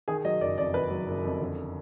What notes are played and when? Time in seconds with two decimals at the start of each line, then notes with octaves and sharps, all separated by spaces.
0.08 D#3 G#4
0.25 F#3 D#5
0.41 F#1 D5
0.58 F2 D5
0.74 D#3 B4
0.91 F#3
1.08 F#1
1.24 F2
1.41 D3